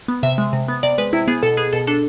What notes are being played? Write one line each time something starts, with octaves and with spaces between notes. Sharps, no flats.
B3
C3 E5
G#3
C3
B3
C3 D5
G#3 B4
C3 E4
B3 G#4
B2 A4
B3 G#4
B2 A4
D4 A4